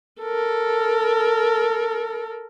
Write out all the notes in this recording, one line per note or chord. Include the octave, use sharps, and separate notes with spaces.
A4 A#4